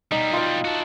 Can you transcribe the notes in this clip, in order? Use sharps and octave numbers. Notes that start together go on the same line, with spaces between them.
B2 G3 D#4 E6
F4 F5
F#4 A4